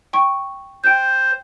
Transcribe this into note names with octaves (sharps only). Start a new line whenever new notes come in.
G5 C#6
C5 G5 F#6 G6